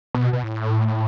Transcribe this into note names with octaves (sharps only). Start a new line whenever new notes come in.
B2
B2
A2